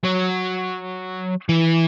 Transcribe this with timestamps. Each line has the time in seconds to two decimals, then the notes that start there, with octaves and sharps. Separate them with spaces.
0.04 F#3
1.49 E3